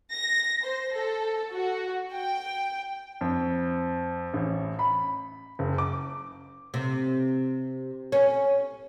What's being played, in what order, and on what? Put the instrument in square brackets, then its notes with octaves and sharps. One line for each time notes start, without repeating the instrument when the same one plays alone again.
[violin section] A#6
C5
A4
F#4
G5
[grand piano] F2
A1
B5
F#1
D6
[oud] C3
C#4